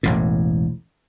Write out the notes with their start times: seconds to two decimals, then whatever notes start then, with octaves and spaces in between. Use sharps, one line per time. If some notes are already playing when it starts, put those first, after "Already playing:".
0.03 E1 A1 A2